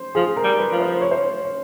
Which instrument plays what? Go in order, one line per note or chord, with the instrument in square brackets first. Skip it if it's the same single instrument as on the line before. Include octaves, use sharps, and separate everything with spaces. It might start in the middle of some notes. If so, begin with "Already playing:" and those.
Already playing: [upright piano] C5
[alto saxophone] F3 [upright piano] G#4
[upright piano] A#4
[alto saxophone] G3
[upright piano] B4
[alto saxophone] F3
[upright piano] C5
C#5
C5
C#5
C#5